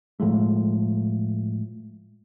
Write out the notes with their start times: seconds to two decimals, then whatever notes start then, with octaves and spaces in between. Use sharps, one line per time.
0.20 A2 F3 G#3 A3